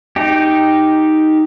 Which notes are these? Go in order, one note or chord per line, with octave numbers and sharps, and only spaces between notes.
D#4 G4